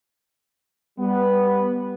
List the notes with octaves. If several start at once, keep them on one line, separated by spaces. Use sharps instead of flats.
G3 B3